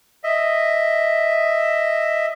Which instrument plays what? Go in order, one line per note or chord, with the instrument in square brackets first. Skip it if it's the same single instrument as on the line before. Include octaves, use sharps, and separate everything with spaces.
[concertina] D#5 E5